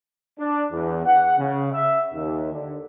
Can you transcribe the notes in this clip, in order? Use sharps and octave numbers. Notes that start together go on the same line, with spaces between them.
D4
E2
F#5
C#3
E5
D#2
D3